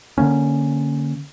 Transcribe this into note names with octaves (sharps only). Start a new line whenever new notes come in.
D3 E3 A#3 C#4